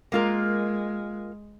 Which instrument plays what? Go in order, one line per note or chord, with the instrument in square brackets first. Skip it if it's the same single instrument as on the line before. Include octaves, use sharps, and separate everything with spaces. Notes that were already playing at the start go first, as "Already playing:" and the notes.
[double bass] G#3 [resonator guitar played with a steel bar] A#3 F4 A#4